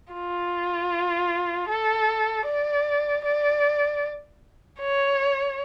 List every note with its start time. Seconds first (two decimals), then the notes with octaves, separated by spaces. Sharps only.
0.13 F4
1.69 A4
2.46 D5
3.25 D5
4.79 C#5